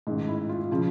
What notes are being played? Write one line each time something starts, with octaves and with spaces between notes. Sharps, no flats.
A1 G#2 D#3
E4
F4
C#3 F3